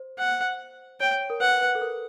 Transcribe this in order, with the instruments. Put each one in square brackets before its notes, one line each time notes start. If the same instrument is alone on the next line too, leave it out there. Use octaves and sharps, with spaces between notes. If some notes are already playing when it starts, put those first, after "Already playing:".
Already playing: [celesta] C5
[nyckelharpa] F#5
[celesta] C#5 [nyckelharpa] G5
[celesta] A#4
[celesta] B4 [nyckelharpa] F#5
[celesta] B4
A4
A#4